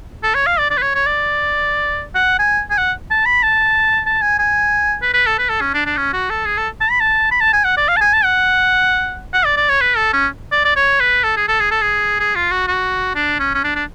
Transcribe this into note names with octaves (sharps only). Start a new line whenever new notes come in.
A4
C#5
F5
D5
D5
B4
C#5
C#5
D5
F#5
G#5
G#5
F#5
A5
B5
A5
A5
G#5
G#5
B4
B4
A4
B4
A4
C#4
D4
D4
C#4
F#4
A4
G#4
A4
A5
B5
A5
B5
A5
G#5
F#5
D5
F5
A5
G#5
A5
F#5
F#5
D5
D5
C#5
B4
A4
C#4
D5
D5
C#5
B4
A4
G#4
A4
G#4
A4
G#4
G#4
F4
F#4
F#4
D4
C#4
C#4
D4
D4